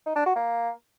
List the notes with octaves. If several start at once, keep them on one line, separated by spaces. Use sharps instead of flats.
D#4
D4
F#4
A#3